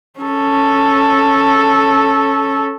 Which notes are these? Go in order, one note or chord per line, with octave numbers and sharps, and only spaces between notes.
C#4 A4